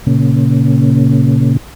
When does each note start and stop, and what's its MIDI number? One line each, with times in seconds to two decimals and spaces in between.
0.07 1.57 46
0.07 1.57 49